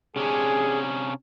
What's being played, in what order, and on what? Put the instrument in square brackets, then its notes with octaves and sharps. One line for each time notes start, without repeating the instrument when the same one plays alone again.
[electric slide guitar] C3 C#4 D4 [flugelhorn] G#4